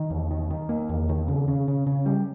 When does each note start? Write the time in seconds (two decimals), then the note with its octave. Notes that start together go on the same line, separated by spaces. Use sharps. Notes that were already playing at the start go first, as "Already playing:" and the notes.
Already playing: D#3
0.11 E2
0.31 D#3
0.51 D#3
0.69 A#3
0.89 E2
1.09 D#3
1.28 C#3
1.48 C#3
1.68 C#3
1.87 C#3
2.06 G3